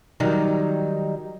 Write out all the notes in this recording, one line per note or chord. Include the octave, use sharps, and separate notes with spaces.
D#3 F#3 G3 D#4